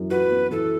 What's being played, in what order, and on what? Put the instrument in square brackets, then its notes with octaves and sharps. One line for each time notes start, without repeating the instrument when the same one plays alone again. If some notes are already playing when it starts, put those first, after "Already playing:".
Already playing: [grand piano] F#2 E3
[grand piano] F#4 [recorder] B4
[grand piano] B3
[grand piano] E3 [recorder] A4